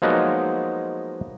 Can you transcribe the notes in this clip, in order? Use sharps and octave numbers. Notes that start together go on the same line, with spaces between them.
F3 F#3 G#3 A#3 B3 D#4